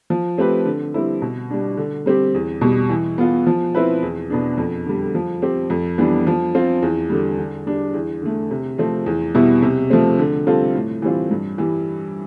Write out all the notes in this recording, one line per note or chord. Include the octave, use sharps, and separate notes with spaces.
F3
A3 C4 G4 B4
D3
G3 C4 E4
B2
G3 D4
D3
G3 C4 G4
E2
B2 G3
E3
B3 F4
F3
C4 E4 B4
E2
B2 B3 D4
F2
D3 G3
F3
C4 G4
F2
E3 G3 B3 D4
F3
C4 F4
E2
D3 G3
D3
G3 D4
E2
D3 A3
C3
F3 A3 C4
E2
B2 G3 B3 E4
C3
F3 A3 C4
D3
G3 C4 F4 A4
A2
E3 G3 C4 F4
G2
E3 G3